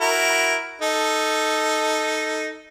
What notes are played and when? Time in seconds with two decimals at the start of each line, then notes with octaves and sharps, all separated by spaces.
0.01 E4 F#4 A#4
0.82 D#4 A4